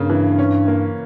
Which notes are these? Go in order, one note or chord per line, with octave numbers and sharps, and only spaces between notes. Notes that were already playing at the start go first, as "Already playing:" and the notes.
Already playing: G2 C#3 A#3
E3
C#4
A#3